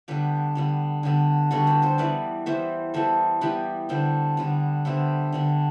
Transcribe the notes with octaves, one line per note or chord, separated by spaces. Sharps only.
D3 G3 B3 G4 B4
D3 G3 B3
D3 G3 B3
D3 G3 B3 F#4 A4
G4 B4
A4 C5
E3 G3 B3 B4 D5
E3 G3 B3 C5 E5
E3 G3 B3 A4 C5
E3 G3 B3 G4 B4
D3 G3 B3 A4 C5
D3 G3 B3
D3 G3 B3 C5 E5
D3 G3 B3